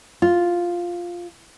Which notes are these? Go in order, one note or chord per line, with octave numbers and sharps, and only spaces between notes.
F4